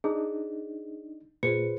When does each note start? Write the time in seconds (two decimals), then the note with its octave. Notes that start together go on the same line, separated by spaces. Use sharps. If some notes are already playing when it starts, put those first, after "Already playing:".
0.04 D4 D#4 G#4
1.43 A#2 F4 G#4 B4 C5 C#7